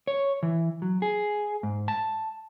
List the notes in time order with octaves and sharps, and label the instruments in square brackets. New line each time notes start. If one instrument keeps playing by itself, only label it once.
[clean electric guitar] C#5
E3
F#3
G#4
G#2
A5